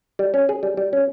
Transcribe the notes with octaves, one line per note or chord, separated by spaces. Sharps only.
G3
C#4
G#4
G3
G3
C#4